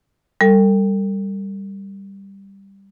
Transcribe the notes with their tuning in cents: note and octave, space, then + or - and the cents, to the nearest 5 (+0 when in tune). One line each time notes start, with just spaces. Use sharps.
G3 +5 A4 +45